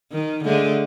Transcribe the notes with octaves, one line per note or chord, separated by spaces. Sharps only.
D#3
D3 G#3 A3